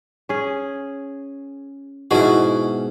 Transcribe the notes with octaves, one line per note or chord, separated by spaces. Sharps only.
C#4 G#4
G#2 B2 E4 F#4 G#4